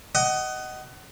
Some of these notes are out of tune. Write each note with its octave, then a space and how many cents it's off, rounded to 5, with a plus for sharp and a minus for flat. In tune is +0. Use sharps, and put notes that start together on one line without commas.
D#5 +0 F#5 +25 D#6 +0